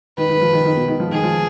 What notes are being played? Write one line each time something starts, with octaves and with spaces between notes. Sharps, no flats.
D#3 B4
D#3
F3
D#3
D#3
B2
D#3
F3
D#3 G#4
F3